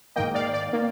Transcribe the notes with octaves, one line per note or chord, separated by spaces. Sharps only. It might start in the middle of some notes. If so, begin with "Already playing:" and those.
G#2 D#3 A#3 D#5 G5
D5 F5
D5
D#3 A#3